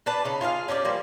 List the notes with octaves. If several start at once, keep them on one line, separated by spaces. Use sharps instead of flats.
D4 B4 A5
C#3 D#4
F4 G#4 E5 F5
C#4 D4 G4 D5
F3 G3 A#3